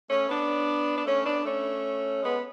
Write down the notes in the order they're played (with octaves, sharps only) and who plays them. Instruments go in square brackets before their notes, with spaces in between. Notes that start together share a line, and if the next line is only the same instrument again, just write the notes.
[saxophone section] A3 C#4
B3 D4
D4
A3 C#4
B3 D4
A3 C#4
G#3 B3